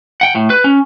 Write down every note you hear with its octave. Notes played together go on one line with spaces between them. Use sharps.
F#5 G5
A2
B4
C#4